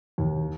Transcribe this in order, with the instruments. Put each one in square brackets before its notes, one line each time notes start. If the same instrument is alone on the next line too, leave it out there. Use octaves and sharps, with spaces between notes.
[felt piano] D#2